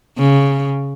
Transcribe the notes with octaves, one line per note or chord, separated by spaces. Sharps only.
C#3